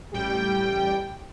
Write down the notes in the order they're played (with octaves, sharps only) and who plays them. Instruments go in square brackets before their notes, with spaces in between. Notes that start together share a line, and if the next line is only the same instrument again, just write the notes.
[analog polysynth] A1 G3 G5 [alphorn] G4